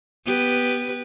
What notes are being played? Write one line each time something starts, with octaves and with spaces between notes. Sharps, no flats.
B3 G4 B4